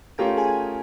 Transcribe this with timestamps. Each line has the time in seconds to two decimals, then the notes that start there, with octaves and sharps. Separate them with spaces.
0.18 A3 C#4 F4 G4 A#4 G5
0.37 G#4 G#5